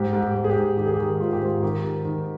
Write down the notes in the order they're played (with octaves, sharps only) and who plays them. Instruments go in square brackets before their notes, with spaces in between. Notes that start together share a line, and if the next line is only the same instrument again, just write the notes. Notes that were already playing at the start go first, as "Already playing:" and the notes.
Already playing: [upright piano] G#2 G4
G#2
G4
G#2
G#4
G4
G#2
D#3 G4
G#4
G4
D#3
G#2 F4
G4
G#2 F4
D#3 G4
D#3
D#3